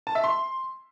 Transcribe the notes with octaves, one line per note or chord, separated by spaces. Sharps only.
A5
E5
C6